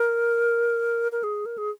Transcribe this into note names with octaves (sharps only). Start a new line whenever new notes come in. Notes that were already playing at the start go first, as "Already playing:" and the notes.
Already playing: A#4
A#4
G#4
A#4
G#4